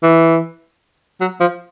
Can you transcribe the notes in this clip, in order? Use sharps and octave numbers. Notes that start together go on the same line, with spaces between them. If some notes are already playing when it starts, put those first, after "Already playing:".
E3
F#3
F3